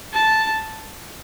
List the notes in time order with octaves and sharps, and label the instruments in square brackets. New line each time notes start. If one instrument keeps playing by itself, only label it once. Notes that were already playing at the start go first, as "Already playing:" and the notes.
[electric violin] A5